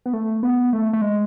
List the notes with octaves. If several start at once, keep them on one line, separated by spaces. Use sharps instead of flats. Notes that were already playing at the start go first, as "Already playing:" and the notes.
B3
A3
B3
A3
A3
G#3